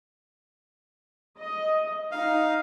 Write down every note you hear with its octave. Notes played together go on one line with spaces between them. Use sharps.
D#5
D#4 F5